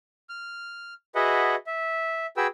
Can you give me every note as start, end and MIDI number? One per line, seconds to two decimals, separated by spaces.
0.29 0.94 89
1.15 1.55 66
1.15 1.55 68
1.15 1.55 71
1.15 1.55 75
1.15 1.55 76
1.15 1.55 78
1.67 2.26 76
2.37 2.47 66
2.37 2.47 68
2.37 2.47 71
2.37 2.47 79
2.37 2.47 88